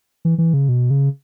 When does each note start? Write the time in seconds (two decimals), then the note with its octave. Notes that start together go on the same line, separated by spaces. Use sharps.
0.25 E3
0.38 E3
0.54 C#3
0.69 B2
0.90 C#3